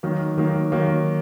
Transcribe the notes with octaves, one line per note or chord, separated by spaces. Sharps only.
D#3 F#3 A#3
D#3 F#3 A#3
D#3 F#3 A#3